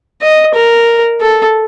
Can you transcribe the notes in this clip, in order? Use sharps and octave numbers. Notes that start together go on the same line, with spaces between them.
D#5
A#4
A4